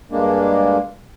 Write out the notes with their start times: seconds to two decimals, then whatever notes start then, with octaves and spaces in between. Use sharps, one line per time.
0.12 G2 G#3 A#3 D4